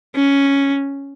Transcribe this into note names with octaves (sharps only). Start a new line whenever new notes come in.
C#4